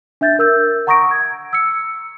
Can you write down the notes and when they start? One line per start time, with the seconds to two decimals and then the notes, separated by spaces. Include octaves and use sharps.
0.21 D4 E5 G6 A6
0.39 A#4 E6 G6
0.87 F#5 A#5 C#6 D#6 A#6 D7
1.11 G#6
1.53 E6 C#7